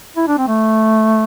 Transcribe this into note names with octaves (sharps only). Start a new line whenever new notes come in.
E4
D4
C4
A3